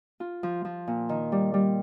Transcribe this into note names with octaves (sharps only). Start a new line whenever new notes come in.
F4
F3
F3
A#2
D#3
G3
G3